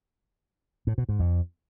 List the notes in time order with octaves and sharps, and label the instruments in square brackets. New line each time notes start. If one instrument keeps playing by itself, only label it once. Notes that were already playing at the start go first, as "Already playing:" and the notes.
[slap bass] A2
B2
G#2
F2